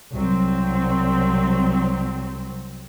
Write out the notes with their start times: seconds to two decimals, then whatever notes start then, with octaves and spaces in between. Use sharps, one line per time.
0.12 C2 F#3 C4